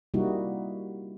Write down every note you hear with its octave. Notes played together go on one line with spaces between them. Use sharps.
C3 G3 A#3 D#4 E4 F#4